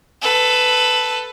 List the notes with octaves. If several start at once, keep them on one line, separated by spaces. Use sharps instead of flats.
A4 B4